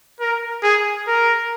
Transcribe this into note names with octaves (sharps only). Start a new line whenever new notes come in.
A#4
G#4
A#4